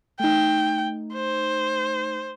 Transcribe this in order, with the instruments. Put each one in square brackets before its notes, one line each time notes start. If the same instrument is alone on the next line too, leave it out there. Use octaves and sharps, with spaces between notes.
[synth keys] A3 D#4 [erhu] G5
[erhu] C5